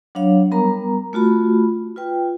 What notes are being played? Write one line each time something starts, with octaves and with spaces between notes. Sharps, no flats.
F#3 D4 C#5 F5
G3 B3 A#4 A#5
A3 F4 F#4 B5
F4 B4 G5